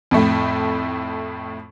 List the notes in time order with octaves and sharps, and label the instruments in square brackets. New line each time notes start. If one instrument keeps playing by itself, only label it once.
[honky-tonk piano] F2 A2 A3